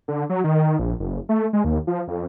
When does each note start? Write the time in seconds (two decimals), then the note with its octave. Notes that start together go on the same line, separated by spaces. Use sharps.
0.08 D3
0.29 F#3
0.44 D#3
0.79 A#1
0.99 F#1
1.29 A3
1.53 G#3
1.64 D#2
1.87 F3
2.08 F2